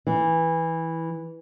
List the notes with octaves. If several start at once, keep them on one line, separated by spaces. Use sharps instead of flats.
E3